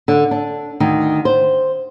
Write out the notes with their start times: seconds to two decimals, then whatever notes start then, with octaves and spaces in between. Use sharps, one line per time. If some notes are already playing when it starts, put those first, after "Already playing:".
0.08 D3
0.31 D4
0.80 D2 D#3
1.25 C5